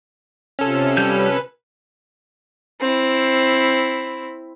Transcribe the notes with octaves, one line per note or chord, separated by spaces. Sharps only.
C3 C#4 F4 A4
G3 B4 G6
C4 E4